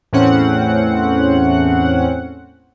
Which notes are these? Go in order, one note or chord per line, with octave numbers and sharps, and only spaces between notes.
E2 A2 C4 C#4 F#5